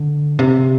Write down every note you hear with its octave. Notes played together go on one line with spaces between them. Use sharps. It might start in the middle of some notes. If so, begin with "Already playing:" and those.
Already playing: D3
C3